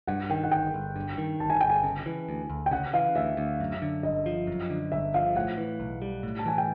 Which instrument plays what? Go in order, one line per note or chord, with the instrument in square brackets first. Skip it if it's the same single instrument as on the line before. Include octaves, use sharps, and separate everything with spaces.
[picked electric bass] G2 [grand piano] F#5
[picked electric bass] D#3 [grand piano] G5
[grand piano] F#5
[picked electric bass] G1 [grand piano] G5
[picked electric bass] G1
G2
D#3
[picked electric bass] G1 [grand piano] A5
[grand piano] G#5
[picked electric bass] G1 [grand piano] G5
[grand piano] G#5
[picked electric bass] C#3
E3
D2
D2
[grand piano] G5
[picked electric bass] C#3 [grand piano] F#5
[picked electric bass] E3 [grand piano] F5
[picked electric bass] D2 [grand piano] E5
[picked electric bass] D2
F#2
D3
[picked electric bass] G1 [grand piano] D#5
[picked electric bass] F3
F#2
D3
[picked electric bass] G1 [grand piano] E5
[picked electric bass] F3 [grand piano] F5
[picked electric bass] A2 [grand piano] F#5
[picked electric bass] E3
B1
G3
A2
[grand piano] A5
[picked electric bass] E3 [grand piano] G#5
[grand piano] G5